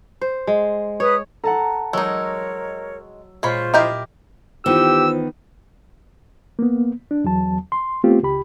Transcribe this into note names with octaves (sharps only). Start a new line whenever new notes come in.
C5
G#3
B4 C#5 D#6
A4 F#5 A5 A#5
F#3 G#3 D#4 A#4 C#5 C#6 E6
A#2 G#3 F4 C5 C#5 B5
E4 G4 A#4 D#5
D#3 E3 B3 E4 F4 G4 C5 E6
A#3 B3
D4
E2 F#3 A5
C6
A3 B3 C4 F4 G4
C#2 G4 B5